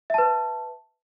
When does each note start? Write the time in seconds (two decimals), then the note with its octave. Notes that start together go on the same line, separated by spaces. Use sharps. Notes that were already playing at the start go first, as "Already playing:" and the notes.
0.10 E5
0.14 A5
0.18 B4